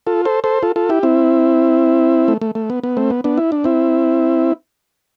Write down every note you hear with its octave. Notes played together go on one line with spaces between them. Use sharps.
F4 A4
A4 C5
A4 C5
F4 A4
F4 A4
E4 G4
C4 E4
A3
A3
A3
B3
B3
A3 C4
B3
B3 D4
E4
D4
C4 E4